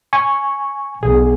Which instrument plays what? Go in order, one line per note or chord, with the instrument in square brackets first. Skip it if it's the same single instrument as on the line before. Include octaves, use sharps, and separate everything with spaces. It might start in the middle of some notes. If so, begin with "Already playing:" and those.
[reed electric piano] G#5 C#6
[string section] B1 [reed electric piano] G#4